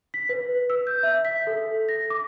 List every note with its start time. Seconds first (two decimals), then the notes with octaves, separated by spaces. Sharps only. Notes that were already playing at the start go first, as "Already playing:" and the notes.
0.14 B6
0.29 B4
0.70 E6
0.87 G6
1.03 E5
1.25 B6
1.47 A4
1.89 A#6
2.10 D6